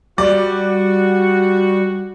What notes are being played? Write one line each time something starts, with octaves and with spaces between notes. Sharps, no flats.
G3 F#4 D5